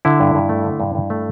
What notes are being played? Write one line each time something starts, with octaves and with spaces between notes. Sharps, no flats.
D3 E4
G2
G2
A3
D3
G2
G2
A3